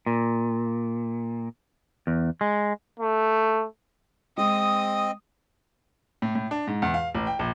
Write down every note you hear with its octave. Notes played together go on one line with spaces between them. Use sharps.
A#2
E2
G#3
A3
G#3 C4 D#5 D#6
A2
A2
D4
G#2
E2
F5
A1
G5
A#1